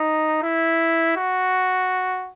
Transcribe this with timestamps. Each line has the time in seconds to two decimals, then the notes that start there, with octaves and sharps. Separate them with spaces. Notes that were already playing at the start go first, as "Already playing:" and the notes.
Already playing: D#4
0.43 E4
1.17 F#4